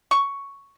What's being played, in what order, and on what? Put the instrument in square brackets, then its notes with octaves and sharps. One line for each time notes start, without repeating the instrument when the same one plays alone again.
[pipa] C#6